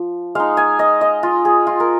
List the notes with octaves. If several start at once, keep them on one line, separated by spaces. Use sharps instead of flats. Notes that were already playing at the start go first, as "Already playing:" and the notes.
Already playing: F3
G#3 D#4 F5
G#5
D#5
D#5
F4
G#4
F4
A#4